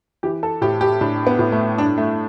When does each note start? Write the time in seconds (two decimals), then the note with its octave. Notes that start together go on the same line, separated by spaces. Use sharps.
0.23 E3 G4
0.43 A4
0.61 A2 G4
0.81 G4
1.01 A2 D4
1.27 B3
1.39 A2
1.52 A3
1.78 G2 D4
1.98 A3